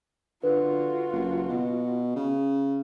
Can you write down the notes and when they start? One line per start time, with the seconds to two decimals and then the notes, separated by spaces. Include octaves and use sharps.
0.43 D3 F4 F#4 B4
1.12 F#1
1.49 B2
2.16 C#3